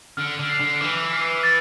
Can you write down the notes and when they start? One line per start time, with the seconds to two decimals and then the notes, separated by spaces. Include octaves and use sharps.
0.17 D3 F6
0.39 D3
0.50 C7 F7
0.60 D3
0.81 E3 D6
1.13 F6 C7
1.43 A6